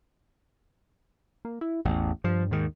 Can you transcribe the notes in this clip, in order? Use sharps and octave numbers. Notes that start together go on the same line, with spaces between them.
A#3
E4
A1 E2
G2 F3
D#2 G#2 D#3